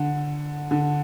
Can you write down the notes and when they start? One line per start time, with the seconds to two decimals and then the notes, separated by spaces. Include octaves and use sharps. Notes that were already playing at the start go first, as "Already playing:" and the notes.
Already playing: D3
0.71 D3